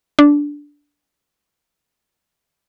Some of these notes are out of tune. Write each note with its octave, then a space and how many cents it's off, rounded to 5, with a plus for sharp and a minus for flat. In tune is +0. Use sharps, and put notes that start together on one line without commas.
D4 -10